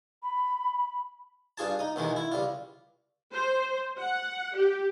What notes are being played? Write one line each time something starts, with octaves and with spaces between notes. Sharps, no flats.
B5
G2 F4 G#4 A5
D#4 D#6
D#2 B2 D#3 E3 G#3
E4
C#2 G3 F4
C5
F#5
G4